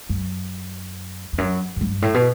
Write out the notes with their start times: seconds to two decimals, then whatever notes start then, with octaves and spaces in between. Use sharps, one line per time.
0.09 F#2
1.33 E2
1.38 F#2
1.76 F#2
1.81 G2
2.02 A2
2.14 B2